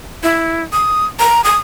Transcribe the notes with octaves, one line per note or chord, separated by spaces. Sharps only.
E4
D#6
A#5
D#6